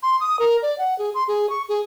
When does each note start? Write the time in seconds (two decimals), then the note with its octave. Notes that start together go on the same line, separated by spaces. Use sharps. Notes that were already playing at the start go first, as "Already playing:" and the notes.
0.03 C6
0.20 D#6
0.39 A#4
0.62 D5
0.78 F#5
0.99 G#4
1.14 C6
1.28 G#4
1.50 C#6
1.69 G#4